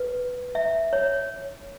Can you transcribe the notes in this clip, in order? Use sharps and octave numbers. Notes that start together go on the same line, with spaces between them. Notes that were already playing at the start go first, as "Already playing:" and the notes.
Already playing: B4
E5
C#5